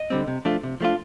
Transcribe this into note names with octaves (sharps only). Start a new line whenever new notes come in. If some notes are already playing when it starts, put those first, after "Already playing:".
Already playing: D#5
D3 G3 C4
C3
F3 A3 D4 F4
C3
F3 A3 D4 F4